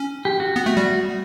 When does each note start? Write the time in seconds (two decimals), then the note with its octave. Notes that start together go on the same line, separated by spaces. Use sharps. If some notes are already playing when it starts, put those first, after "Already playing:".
Already playing: C#4
0.25 G4
0.40 F#4
0.56 B3
0.66 A3
0.77 G3